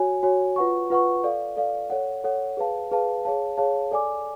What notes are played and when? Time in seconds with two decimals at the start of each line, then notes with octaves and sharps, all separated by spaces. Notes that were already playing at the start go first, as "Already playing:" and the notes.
Already playing: F#4 C#5 G#5
0.23 F#4 C#5 G#5
0.56 F4 B4 F#5 C#6
0.90 F4 B4 F#5 C#6
1.24 A4 D5 F5
1.57 A4 D5 F5
1.90 A4 C#5 F#5
2.24 A4 C#5 F#5
2.57 G#4 B4 F5 A5
2.91 G#4 B4 F5 A5
3.25 G#4 C#5 F5 A5
3.57 G#4 C#5 F5 A5
3.91 A4 D5 G#5 D6